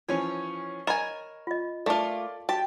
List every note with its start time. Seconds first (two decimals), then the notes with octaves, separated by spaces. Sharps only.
0.08 E3 F3 C#4 C#5
0.87 A#4 D#5 G#5 A#5 B5 E7
1.47 F4 D#5
1.86 A3 A#3 F4 A4 D5 A5 D6
2.49 F#4 G4 A5